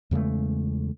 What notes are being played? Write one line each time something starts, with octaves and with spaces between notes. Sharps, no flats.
E2 C#3 G#3 A3